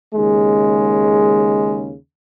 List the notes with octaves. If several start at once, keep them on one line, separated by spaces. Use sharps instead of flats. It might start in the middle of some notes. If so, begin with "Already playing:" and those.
D#2 C#3 G#3